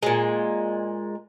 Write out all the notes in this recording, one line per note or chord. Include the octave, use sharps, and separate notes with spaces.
A#2 G#3